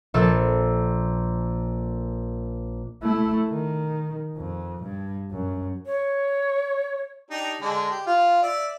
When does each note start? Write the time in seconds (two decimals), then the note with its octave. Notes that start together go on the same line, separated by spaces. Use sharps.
0.14 A#1 A4 E6
3.02 A3 E4
3.49 D#3
4.37 F2
4.83 G2
5.31 F#2
5.86 C#5
7.31 D4 D#4 G4
7.61 D3 G#3 D4
7.91 G4
8.06 F4
8.43 D5 E5